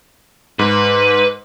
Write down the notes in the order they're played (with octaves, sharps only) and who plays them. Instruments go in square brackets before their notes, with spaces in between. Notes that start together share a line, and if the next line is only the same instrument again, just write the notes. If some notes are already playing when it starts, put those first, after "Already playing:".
[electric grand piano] G#2 [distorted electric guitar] B4